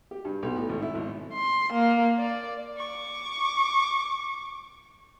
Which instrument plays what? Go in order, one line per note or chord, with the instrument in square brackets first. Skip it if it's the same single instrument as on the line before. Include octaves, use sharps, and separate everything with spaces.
[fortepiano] G4
G2
B1
A2
G#1
E4
G#1
[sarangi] C6
A#3
D5
[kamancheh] C#6 D6